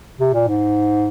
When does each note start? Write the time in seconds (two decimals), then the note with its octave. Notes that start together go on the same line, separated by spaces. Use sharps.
0.20 C3
0.34 A#2
0.48 G#2